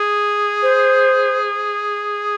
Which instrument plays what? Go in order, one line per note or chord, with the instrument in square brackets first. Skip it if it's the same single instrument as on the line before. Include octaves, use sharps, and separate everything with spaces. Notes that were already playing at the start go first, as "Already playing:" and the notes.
Already playing: [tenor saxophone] G#4
[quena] C5